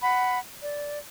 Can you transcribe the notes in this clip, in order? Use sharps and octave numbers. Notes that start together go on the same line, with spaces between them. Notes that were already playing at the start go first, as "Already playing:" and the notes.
F#5 B5
D5